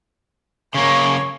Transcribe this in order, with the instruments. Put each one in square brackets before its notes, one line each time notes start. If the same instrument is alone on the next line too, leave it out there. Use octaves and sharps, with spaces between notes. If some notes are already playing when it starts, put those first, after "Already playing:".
[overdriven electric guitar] C#3 A#3 [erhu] C#5